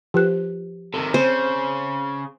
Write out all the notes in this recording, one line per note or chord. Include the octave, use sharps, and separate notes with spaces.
F3 G4 B4 F#6
C3 D#3 A4
C#3 C4 C5